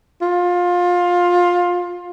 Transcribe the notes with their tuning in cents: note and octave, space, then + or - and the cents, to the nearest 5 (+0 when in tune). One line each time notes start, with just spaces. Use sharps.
F4 +20